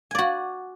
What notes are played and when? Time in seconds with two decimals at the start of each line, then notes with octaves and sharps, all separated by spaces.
0.11 G#5
0.15 D5
0.18 F#4